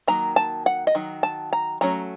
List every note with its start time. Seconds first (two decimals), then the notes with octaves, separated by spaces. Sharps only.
0.07 D#3 F#3 A#3 A#5
0.36 A5
0.66 F#5
0.87 D#5
0.95 D#3 F#3
1.23 A5
1.53 A#5
1.81 F#3 A3 C#4 A#5